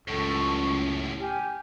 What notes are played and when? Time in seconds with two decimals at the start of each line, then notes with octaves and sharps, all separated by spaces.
0.08 C#2 F#2 A2 A4 C#6
1.19 G4 G#5 F6